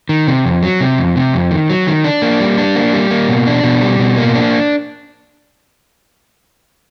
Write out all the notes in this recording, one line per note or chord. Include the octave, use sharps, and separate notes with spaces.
D#3
C3
F2
F#3
C3
F2
C3
F2
D#3
F#3
D#3
D4
A#3
G3
D4
A#3
G3
A#3
B2
D4
B2
G3
B2
A#3
D4